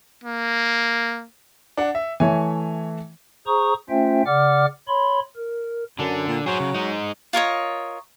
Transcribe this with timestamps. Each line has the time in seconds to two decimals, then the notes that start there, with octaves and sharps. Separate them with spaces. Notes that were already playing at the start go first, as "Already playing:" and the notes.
0.24 A#3
1.77 D4 F#5
1.95 E5
2.20 E3 A3 C#5 G#5
3.47 G#4 C5 A#5 C#6 D#6
3.89 A3 C#4 F4 C5 E5 G5
4.26 C#3 D5 F#5 D6 F6
4.88 C#5 B5 C6
5.36 A#4
5.99 F#2 D3 D4
6.28 A#2
6.46 F#3 G#4 C5
6.60 C#3
6.74 G#3 D#4
7.33 F4 A#4 C#5 D#5